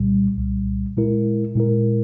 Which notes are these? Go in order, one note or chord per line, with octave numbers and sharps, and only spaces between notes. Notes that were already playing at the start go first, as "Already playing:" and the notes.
Already playing: C2 A#2 G3
C2 A#2 G3
A#2 G#3 E4 A#4
A#2 G#3 E4 A#4